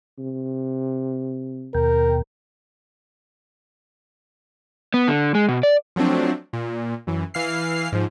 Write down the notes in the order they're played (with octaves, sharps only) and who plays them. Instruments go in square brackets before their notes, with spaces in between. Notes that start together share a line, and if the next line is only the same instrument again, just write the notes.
[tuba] C3
[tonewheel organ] D#2 B2 G5 [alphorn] A#4
[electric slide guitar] B3
D3
G#3
B2
D5
[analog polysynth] F3 F#3 A3 C4 D4
A#2
F#2 E3
E3 F5 F6 C7
G#2 F3